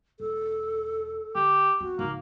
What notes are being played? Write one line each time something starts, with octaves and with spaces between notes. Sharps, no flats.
E1 A4
D3 G4
B3 C4 F#4
G#2 C#3 A#3